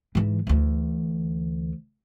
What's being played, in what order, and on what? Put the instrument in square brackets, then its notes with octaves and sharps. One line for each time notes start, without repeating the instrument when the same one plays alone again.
[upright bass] G#2 E3
D2 E3